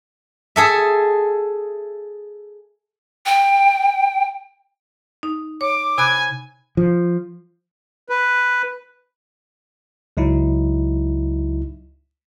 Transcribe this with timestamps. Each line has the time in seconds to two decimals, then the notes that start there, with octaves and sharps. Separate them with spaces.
0.56 G#4 A4 E5
3.26 G5
5.23 D#4
5.61 C#5 D6
5.98 C3 G#5 B5 F#6
6.77 F3
8.09 B4
10.17 C#2 F#3 D#4 E4